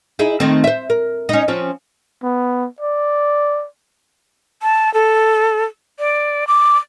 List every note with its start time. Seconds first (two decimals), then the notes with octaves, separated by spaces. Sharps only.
0.19 D#4 E4 G#4
0.40 D#3 A3 C4
0.64 C5 E5
0.90 A#4
1.29 C#4 D#4
1.48 F3 C4 C#4
2.23 B3
2.81 D5
4.62 A5
4.94 A4
5.99 D5
6.47 D6